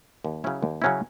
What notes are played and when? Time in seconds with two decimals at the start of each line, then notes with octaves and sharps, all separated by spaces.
0.25 D#2
0.44 C#3 F#3 C#4 E4
0.63 D#2
0.82 C#3 F#3 C#4 E4